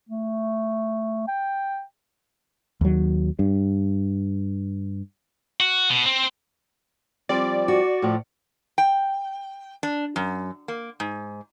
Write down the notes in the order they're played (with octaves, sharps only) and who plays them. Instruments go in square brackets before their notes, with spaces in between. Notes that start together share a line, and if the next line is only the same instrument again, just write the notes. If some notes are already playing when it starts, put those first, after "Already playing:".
[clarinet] A3
G5
[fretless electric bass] D#2 F#3
G2
[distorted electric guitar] F#4
B2
C4
[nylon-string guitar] F3 G3 C4 [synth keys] D5
[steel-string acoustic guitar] F#4
[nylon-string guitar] A2 F3
[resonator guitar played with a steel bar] G5
D4
F#2
A#3
G#2